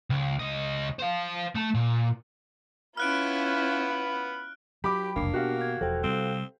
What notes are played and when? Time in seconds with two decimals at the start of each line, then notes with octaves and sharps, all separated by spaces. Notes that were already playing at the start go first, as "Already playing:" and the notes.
0.10 C#2
0.39 C#2 D#5
0.99 C5 F5
1.55 A3 A5
1.75 A#2
2.97 B3 C#4 E4 F4 B5 F6 F#6 D7
4.84 F#3 G4 G5 B5 D6
5.16 F#1 C2 F2 A#3 D4 C7
5.34 B2 F#4 G4 F5
5.61 G#6
5.81 E1 F3 A4 C5 G5
6.04 C3 G3 C4